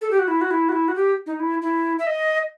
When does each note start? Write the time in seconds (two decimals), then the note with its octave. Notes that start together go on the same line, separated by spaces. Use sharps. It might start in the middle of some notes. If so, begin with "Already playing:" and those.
0.01 A4
0.11 G4
0.19 F#4
0.28 E4
0.41 F#4
0.51 E4
0.69 F#4
0.72 E4
0.88 F#4
0.96 G4
1.26 D#4
1.40 E4
1.62 E4
1.99 E5
2.07 D#5